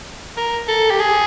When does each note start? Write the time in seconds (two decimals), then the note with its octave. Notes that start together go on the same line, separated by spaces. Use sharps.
0.37 A#4
0.68 A4
0.90 G4
1.00 G#4